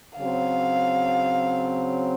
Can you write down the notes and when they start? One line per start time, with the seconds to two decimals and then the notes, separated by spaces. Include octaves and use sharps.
0.17 C#3 F#3 C4 F5